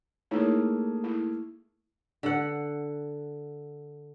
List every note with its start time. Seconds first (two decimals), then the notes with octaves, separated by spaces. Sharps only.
0.31 A3 A#3 D#4 E4 G#4 C#5
1.04 E4
2.23 D3 F#5